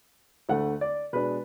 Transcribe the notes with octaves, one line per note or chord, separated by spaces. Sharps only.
D2 D3 A3 F#5
D5
B2 G#3 D4 B4